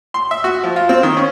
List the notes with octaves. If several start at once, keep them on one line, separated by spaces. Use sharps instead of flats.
C6
E5
F#4
F3
F4
C4
D#3
C#4